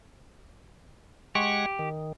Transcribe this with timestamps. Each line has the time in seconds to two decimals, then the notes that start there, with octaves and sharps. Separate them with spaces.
1.35 G#3 G4 F#5 C#6
1.79 D#3